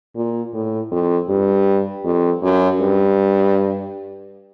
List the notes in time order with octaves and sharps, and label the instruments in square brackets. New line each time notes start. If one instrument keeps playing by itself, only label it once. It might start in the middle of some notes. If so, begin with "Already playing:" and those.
[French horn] A#2
A2
F2
G2
F2
F#2
G2